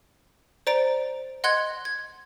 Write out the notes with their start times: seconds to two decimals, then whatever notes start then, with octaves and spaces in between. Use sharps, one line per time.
0.67 C5 D5 A#5 D7
1.44 D#5 F#5 C6 F#6 G#6
1.85 G#6